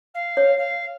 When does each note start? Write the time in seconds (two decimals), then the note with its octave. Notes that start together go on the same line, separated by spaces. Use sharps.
0.14 F5
0.37 C#5
0.58 F5